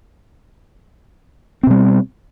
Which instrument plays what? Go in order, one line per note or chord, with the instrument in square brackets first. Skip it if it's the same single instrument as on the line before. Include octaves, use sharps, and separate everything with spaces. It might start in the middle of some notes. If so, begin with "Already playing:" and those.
[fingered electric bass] C4
B2
G3